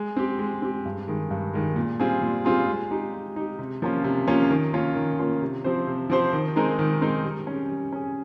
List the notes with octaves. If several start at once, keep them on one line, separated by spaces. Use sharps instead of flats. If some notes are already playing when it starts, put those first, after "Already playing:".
Already playing: G#3
C4 G4
G#3
C4 G4
G2
D#3 G#3
G2
D#3 G#3
A#2
G3 C4 F4 G#4
A#2
G3 C4 F4 G#4
G#3
D#4 G4
G#3
D#4 G4
C3
F3 A#3 C#4 F4
C3
F3 A#3 C#4 F4
D#3
A#3 C#4 F4
D#3
A#3 C#4 F4
C3
F3 C4 G4 C5
C3
F3 C4 G4 C5
D#3
G#3 C4 D#4 A#4
D#3
G#3 C4 D#4 A#4
G3
C#4 G#4
G3
C#4 G#4